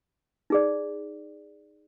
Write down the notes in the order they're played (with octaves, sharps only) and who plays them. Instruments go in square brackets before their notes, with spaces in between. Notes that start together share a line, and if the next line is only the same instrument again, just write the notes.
[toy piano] D#4 G#4 D5